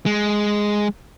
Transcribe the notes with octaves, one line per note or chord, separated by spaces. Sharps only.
G#3